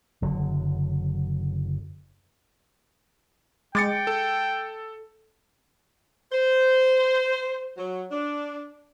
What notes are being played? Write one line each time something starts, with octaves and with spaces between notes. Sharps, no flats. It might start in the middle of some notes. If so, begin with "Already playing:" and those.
F#1 D3 F#3
G#3 G5 D6 A6 C#7
A4
C5
F#3
D4